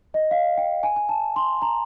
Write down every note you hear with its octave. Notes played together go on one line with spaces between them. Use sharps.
D#5
F5
G5
G#5
G#5
A5
C6
A#5